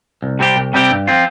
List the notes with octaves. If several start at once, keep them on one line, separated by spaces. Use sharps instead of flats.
C2
C3 G3 C4 G4
C2
C3 G3 C4 G4
G2
F3 C4 F4